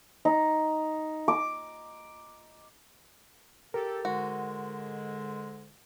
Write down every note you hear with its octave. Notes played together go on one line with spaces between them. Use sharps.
D#4
D6
G4 A4 A#4
G#2 D3 G#3 F#4